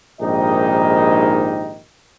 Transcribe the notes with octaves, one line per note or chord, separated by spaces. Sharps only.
A#1 G#2 D#3 D#4 G4 D#5